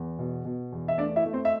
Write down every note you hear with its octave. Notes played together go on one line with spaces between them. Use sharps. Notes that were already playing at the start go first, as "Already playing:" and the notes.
Already playing: E2
B2
B2
E2
E5
A3 D4 D5
E4 E5
A3
C4 C5
E5